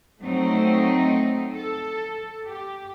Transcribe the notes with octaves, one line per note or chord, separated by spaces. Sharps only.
F#3 A3 C4 D#4
A4
G4